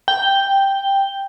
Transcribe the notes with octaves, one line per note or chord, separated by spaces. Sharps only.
G5